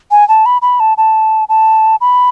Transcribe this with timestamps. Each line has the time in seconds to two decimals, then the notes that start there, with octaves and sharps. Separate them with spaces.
0.11 G#5
0.29 A5
0.46 B5
0.62 B5
0.80 A5
0.98 A5
1.49 A5
2.01 B5